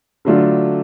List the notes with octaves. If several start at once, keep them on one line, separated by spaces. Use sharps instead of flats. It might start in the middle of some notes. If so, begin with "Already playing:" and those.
D3 F#3 A3 D4 F4